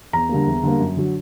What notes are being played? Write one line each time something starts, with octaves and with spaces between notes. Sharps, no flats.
E2 A#5
D3 G3 A#3
E2
D3 G3 A#3
F#2
D3 F#3